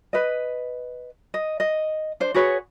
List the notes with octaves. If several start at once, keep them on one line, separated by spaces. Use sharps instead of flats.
B4 D#5
D#5
D#5
D4 C5
F#4 G#4 B4 C#5